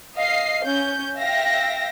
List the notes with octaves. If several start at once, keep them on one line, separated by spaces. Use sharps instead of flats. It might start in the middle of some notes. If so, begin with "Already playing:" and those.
D#5 F5 C7
C#4 G6
E5 F5 G5 A#6